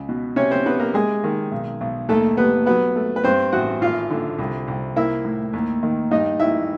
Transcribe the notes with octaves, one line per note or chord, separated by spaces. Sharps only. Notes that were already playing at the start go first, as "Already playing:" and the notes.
Already playing: C#2
B2
C3 C#4 C#5
C4 C5
C3 B3 B4
A#3 A#4
G#3 G#4
D#3
B1
B1
D#2 A3 A4
G3 B3 B4
F#3 B3 B4
A3
B4
G2 C4 C5
A1 F#4 F#5
G#1 F4 F5
D3
C2
C2
A#3 E4 E5
A2
D#2
D#3
G2 D#4 D#5
G#1 E4 E5